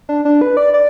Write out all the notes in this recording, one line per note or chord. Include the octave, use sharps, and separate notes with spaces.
D4
D4
B4
D5
D5